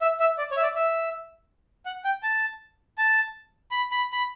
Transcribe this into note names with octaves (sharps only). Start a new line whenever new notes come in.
E5
E5
D5
C#5
E5
D5
E5
F#5
G5
A5
A5
B5
B5
B5